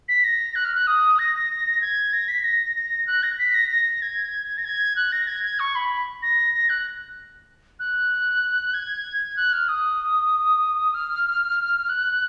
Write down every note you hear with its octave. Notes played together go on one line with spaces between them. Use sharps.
B6
A#6
F#6
F6
F#6
D#6
A#6
G#6
A#6
B6
A#6
A#6
F#6
A#6
B6
A#6
A#6
G#6
A#6
G#6
F#6
A#6
G#6
G#6
C#6
B5
A#6
A#6
F#6
F#6
G#6
F#6
F6
D#6
F6
F#6